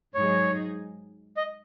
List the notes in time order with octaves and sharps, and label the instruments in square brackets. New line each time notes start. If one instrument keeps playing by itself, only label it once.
[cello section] G#2 F#3 D#4 G#4 [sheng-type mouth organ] C#5
[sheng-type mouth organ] D#5